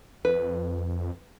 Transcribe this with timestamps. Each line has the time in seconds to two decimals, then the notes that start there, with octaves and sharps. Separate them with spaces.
0.25 F2 B4